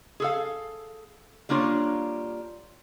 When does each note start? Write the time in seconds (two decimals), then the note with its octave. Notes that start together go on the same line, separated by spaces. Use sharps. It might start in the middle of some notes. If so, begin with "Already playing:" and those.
0.20 G#4 A4 F5
1.49 G3 A#3 D4 F4 C#5